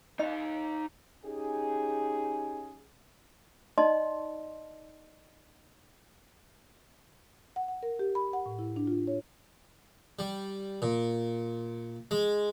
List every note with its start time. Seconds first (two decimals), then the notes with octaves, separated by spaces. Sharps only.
0.19 D#4 D#5 F5
1.25 C#4 D#4 G4 G#4
3.78 D#4 D5 D#5 A5 C6
7.56 F#5
7.68 F#5
7.83 A#4
7.99 G4
8.15 B5
8.33 F#5
8.46 A2
8.59 E4
8.76 D4
8.87 F4
9.07 C#5
10.19 G3
10.82 A#2
12.11 G#3